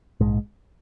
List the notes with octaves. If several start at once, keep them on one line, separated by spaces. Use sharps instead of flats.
A#1 G#2 G#3